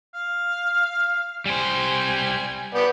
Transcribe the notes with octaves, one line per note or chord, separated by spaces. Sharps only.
F5
G3 C5 G#5
B3 G4 D5